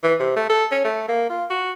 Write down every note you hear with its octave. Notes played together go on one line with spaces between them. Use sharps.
E3
C3
A3
A4
C#4
A3
A#3
F4
F#4